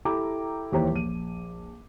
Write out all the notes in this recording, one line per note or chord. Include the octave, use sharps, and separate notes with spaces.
E4 G4 A4 G5 A#5 D6
D#2 E3 G4 C5 C#5 A#5
A#1 D#7